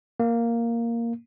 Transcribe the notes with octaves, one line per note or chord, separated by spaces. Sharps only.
A#3